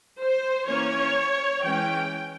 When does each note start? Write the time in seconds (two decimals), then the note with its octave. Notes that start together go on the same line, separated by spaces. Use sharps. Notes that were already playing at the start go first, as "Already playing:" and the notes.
0.20 C5
0.67 E3 A#3 C#4 C#5
1.63 E3 G#3 C#4 G5